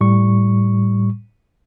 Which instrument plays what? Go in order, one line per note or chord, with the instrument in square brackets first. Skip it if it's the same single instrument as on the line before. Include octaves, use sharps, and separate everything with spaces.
[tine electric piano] A2 G3 C#6